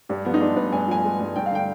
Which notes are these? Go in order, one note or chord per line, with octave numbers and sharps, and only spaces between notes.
G2 G4
F3 B3
D#4
G#3 D4
G2 B4
G2 G#5
F3 G#5
G#3
G2
G2 G5
F5
D3 G5